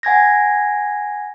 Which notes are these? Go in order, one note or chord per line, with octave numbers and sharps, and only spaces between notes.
F#5 G#5 G#6 A#6